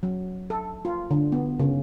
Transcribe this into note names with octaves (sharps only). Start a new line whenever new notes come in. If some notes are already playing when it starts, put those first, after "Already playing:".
F#3
A4
F4
D3
B3
C#3